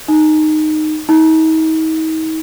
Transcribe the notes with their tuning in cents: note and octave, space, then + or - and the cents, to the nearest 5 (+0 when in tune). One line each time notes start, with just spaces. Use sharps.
D#4 -10
D#4 +40